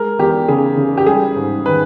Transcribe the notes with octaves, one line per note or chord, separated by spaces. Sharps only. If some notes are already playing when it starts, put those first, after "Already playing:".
Already playing: G#3 A#4
E2 G4
C#3 G#4
C#3
G4
G3 G#4
G#2
D#3 B4